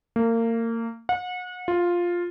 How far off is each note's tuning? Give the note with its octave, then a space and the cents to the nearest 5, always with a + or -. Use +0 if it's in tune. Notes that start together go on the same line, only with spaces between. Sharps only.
A#3 -30
F#5 -35
F4 +5